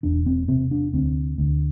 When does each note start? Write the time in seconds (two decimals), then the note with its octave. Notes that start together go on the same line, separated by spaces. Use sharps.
0.03 E1 D4
0.26 C4
0.48 C3 C4
0.71 D4
0.93 D2 C4
1.38 D2